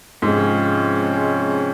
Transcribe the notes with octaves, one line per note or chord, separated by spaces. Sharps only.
G#2 C3 F3 G#3 C#4